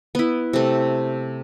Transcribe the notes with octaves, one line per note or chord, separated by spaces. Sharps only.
B3 E4
C3 A3